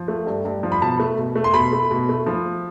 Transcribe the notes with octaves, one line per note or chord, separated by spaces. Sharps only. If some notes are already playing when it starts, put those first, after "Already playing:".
Already playing: F3
A3
G2
G2
F3
B5
B2 A5
A3
B2
A3
C6
B2 B5
A3
B2
A3
F3